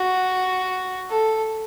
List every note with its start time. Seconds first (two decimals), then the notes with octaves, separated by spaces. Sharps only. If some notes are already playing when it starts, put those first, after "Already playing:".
Already playing: F#4
1.09 A4